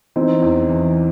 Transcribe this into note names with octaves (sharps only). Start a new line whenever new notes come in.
E3 C4 D#4
E2
E3